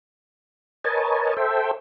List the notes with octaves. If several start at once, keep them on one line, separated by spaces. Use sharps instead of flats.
A#4 B4 C#5 D#5 G#5 A5
A4 C5 E5 G5